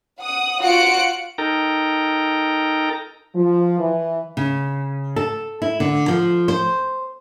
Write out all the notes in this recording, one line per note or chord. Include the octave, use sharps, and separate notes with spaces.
F#5 D#6
F4 F#4 F#5 F#6 C#7 D7
D#4 A4 A#4 G5 A#5
F3
E3
C#3
A4
E4
D3
F3
C5